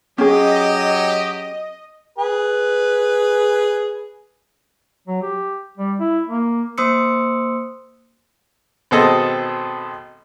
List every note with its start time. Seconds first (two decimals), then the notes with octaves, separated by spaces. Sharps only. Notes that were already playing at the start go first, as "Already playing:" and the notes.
0.18 F#3 C#4 G4 G#4 D#5
2.18 G#4 B4
5.08 F#3
5.23 G4
5.77 G3
6.00 E4
6.28 A#3
6.78 A#3 C5 C6 D#6 E6 C#7
8.91 G#1 B2 C4 G#4 A4 D#5